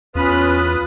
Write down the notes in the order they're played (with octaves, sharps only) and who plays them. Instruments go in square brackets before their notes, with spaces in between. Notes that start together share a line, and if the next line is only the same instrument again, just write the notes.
[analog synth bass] E2 [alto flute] C#4 [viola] F4 B5 [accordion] B4 D#6